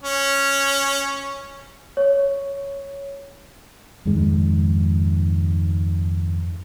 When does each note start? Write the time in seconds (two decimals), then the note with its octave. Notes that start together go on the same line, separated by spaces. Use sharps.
0.03 C#4
1.97 C#5
4.05 F2 G#2 D#3 G#3